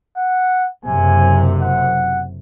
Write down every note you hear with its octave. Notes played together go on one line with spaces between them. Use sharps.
F#5
F#1 F#2 C3 G#5
F#5